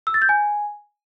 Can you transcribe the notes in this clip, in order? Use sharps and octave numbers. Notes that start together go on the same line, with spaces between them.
E6
A6
G6
G#5